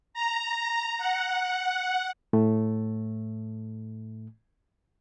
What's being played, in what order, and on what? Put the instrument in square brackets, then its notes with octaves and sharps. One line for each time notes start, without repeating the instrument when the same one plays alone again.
[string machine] A#5
F#5
[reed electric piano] A2 A3